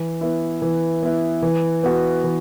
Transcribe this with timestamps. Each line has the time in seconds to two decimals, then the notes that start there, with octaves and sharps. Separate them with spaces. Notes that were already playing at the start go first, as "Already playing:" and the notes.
Already playing: E3
0.21 B3 E4
0.62 E3
1.03 B3 E4
1.42 E3
1.83 B3 F#4
2.24 E3